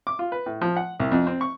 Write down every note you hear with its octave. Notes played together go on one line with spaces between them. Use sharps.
D6
F4
B4
A2
F3
F#5
C2
F2
C4
C#6